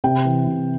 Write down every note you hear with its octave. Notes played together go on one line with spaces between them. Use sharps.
C3 G5
E3
C3